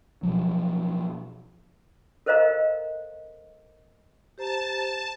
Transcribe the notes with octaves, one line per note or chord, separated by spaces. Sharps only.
B2 F3 F#3
A4 A#4 C5 D#5 F5 A#5
G4 C5 A5 A#5